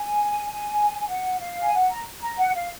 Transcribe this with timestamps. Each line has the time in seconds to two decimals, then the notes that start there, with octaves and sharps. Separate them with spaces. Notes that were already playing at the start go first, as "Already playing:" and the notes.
Already playing: G#5
0.99 G#5
1.07 F#5
1.40 F5
1.62 G#5
1.73 F#5
1.89 A#5
2.21 A#5
2.38 F#5
2.54 F5